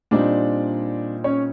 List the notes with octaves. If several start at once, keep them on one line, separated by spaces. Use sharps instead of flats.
A#2 G3 C4 D4 D#4 D5
C#4 C#5